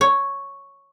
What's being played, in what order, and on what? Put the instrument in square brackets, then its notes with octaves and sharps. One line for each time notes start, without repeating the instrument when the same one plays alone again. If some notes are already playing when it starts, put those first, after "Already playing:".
[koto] C#5